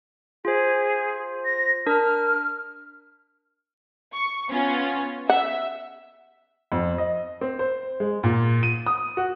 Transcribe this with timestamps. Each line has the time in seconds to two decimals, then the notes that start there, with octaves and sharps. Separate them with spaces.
0.45 F4 G#4 C5
1.45 A#6
1.86 D4 A#4 F6
4.14 C#6
4.50 B3 C#4 F4
5.29 E5 F#5
6.72 F2
6.98 D#5
7.41 C4
7.59 C5
8.00 G#3
8.23 A#2
8.63 D#7
8.86 D#6
9.17 F#4